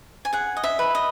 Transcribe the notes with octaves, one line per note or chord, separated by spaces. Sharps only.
G#5
G#4 F#5
D#5
E5
B4
D#5